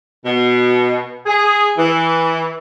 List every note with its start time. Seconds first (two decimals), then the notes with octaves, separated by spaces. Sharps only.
0.24 B2
1.26 G#4
1.77 E3